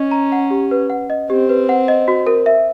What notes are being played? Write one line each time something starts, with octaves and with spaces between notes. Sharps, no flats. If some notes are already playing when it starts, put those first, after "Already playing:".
Already playing: C#4 D#5
A#5
F#5
G4
B4
F#5
D#5
C4 G4
B4
F#5
D#5
F#4
A#4
E5